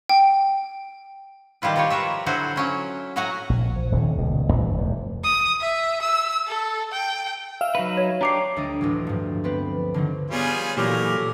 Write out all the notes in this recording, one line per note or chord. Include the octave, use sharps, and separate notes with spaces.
G5
D#3 G3 E4 F4 B4
F3 G3 F4 G4 C#5
F4 A#4 B4 C#5 E5
D3 F#3 E4 F#4 C5
F#3 C#4 E4
A2 F#3 F#4 F#5 G#5 A#5
A#1
F3
D#1 D#2 C3
D#1 C#2 B2
A1 G2 A#2 E3
F1 E2
D#6
E5
E6
A4
G5
E5 F5
F#3 D#4 B4
C#5
D4 G4 C#5 A#5 D6 C7
D2 G3 A3 D4 D#5 D6
A1 D2 F#3
G2 F3
B3 C4 B4
D3 D#3 F3 F#3
G3 B3 F4 G#4 C#5 G#5
A#2 E3 F#3 F#4 G4 A4 A#4